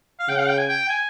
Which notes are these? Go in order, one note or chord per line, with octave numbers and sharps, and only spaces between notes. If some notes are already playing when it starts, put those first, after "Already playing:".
F5
C#3 G5
F5
G5
G#5
G5
G#5